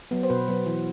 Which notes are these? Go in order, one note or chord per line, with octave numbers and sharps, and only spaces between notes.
F#3 B3
C5
B2 B4
F#3 B3
E3